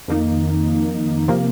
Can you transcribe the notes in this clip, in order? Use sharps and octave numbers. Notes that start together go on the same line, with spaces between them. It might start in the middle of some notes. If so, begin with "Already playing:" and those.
F2 D#3 A#3 D#4
C3 F3 A#3